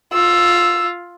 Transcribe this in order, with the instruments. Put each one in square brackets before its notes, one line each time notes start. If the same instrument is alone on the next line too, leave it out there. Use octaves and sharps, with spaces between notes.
[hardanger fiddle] F4 [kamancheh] E6